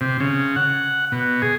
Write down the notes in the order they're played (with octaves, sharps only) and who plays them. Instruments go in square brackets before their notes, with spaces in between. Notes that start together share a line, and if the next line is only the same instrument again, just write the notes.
[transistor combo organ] C3
C#3
F#5
B2
G#4